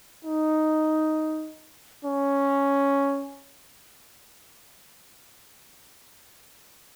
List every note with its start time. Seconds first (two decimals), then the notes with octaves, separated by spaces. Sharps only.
0.25 D#4
2.05 C#4